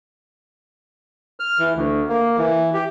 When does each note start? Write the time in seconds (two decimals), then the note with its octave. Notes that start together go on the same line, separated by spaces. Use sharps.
1.40 F6
1.59 E3
1.76 D2
2.09 A#3
2.38 E3
2.74 G4